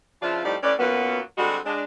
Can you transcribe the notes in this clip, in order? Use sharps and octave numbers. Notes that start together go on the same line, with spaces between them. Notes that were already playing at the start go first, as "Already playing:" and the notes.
C#3 F3 D4 E4 F4
F2 A2 F3 G3 D#4 D5
A2 C#4 B4 D5
F#2 A#2 F#3 A#3 B3 B4
D3 G3 G#3 C4 F#4
G#3 D4